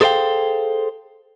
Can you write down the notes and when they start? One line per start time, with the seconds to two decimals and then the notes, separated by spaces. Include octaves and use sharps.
0.01 G#4 A4 C5 D5 F5 G5